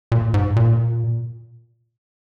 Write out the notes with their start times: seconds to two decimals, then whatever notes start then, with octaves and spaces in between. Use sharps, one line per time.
0.12 A#2
0.34 G#2
0.56 A#2